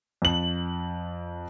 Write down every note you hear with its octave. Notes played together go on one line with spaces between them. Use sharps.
F2 F#7